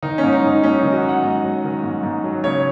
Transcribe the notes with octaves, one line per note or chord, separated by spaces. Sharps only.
D#3 D#4
C#4
G#2
D#4
G#2 D#4
F#3 C#4
D#3 D#4
F#4
G#2 F#5
G#2 D#5
F#3
D#3
G#2
G#2
F#3
C#3 C#5